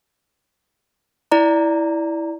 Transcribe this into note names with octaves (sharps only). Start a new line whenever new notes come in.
E4 D5 A#5